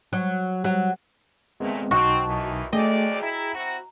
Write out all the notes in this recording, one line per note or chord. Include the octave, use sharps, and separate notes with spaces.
F#3
F#3
A#2 G#3 A3 B3 C4
B1 C4 D#4 F#4 D#5 A5
D#2 D#3 E3
D2 A2 A3 G#4 D5 D#5 G5
E4 A#5
C4 E4 F#4